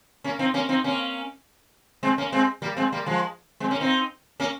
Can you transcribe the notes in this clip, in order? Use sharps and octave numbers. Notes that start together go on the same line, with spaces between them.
A#3 C#4
C4 D#4
A#3 C#4
C4 D#4
A#3 C#4
G#3 C4
A#3 C#4
G#3 C4
G3 A#3
G#3 C4
G3 A#3
F3 G#3
G#3 C4
A#3 C#4
C4 D#4
A#3 C#4